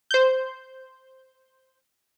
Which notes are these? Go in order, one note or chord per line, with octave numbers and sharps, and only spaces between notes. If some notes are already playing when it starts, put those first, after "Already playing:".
C5 G6